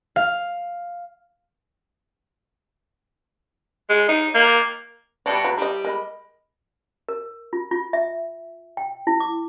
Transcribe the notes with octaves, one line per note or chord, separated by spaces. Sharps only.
F5
G#3
D#4
A#3
B2 G3 A3 D5 E5 F5 A5
F#3 G#3 B4
G3 E4 D#5
G#3 A#4 D#5 B5
A#4
F4
F4
E5
G5
E4
D6